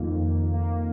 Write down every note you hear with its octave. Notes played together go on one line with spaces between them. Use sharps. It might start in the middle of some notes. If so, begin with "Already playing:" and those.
Already playing: F2 D#3 A#3
F2
A#3